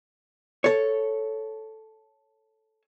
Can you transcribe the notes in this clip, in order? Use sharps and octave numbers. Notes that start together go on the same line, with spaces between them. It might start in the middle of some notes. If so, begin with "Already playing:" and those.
A4 C#5